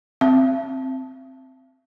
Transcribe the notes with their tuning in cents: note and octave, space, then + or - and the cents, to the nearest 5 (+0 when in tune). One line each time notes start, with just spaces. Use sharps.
C4 +0 E5 +45